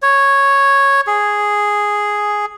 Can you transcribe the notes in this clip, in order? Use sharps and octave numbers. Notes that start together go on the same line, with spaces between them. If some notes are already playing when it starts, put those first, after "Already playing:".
C#5
G#4